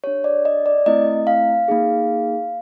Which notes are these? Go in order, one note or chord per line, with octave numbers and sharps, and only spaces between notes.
D4 G4 C#5
D5
D#5
D5
A3 C4 E4 D#5
F5
A#3 D#4 G#4